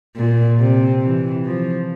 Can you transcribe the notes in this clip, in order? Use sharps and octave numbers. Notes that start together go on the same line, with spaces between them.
A#2
C3
E3
F3